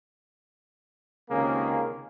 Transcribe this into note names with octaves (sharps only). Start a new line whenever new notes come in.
C#2 C3 D#3 A#3 C#4 G#4